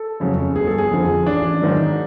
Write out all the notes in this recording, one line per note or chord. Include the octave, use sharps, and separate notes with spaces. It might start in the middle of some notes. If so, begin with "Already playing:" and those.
Already playing: A4
F2 C#3 F#3
G1 G#4
A4
G#4
F2 D3 F3
A1 D4
G#2 D#3 F#3